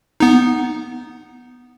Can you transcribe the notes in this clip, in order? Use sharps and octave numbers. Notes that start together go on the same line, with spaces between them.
B3 D#4